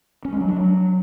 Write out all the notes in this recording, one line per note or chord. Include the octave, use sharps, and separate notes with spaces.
C#4
G#3
F#3
D4
F#3